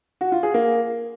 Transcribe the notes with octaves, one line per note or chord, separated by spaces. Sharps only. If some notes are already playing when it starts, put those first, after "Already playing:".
F#4
F4
G#4
A#3